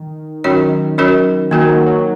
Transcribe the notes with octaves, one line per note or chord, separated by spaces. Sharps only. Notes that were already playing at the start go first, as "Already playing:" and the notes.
Already playing: D#3
D#3 F#3 C#4 F#4 A#4 C#5
F#3 C#4 F#4 A#4 C#5
D#3 A#3 F#4 A#4
F#3
F#3